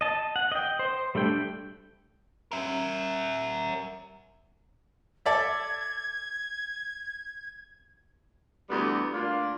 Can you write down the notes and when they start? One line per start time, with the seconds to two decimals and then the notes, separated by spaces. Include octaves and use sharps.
0.01 D#5 A5
0.36 F#5
0.52 D#5 G5
0.79 C5
1.15 G3 A3 D4 G5
2.52 A#4 E5
5.26 A4 D5 E5 G#6
8.70 D2 E3 G3 B3
9.13 D2 A#3 D4 F4